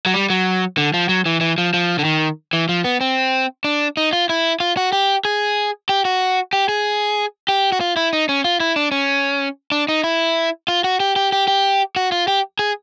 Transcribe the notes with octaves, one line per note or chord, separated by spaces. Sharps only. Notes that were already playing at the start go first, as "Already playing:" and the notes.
F#3
G3
F#3
D3
F3
F#3
E3
E3
F3
F3
D3
D#3
E3
F3
B3
C4
D4
D#4
F4
E4
F4
F#4
G4
G#4
G4
F#4
G4
G#4
G4
F#4
F4
E4
D#4
C#4
F4
E4
D4
C#4
D4
D#4
E4
F4
F#4
G4
G4
G4
G4
F#4
F4
G4
G#4